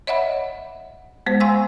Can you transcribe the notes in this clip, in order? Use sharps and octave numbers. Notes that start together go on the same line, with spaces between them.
C#5 D#5 E5 F#5 B5
G#3 B3 C5
F5 G#5 C6 C#6 E6